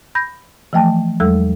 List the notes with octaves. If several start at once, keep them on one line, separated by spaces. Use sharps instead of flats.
B5 G6 A#6
E3 F3 A3 G5 A5
E2 F#3 G#3 A4 E6